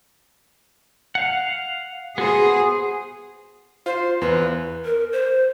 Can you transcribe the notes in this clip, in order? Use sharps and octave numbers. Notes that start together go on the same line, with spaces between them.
F5 F#5
B3 F#4 G#4 C5
F4 C5
E2 B4
A#4
C5